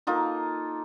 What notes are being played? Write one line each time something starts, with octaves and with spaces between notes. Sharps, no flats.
A#3 D#4 F4 A4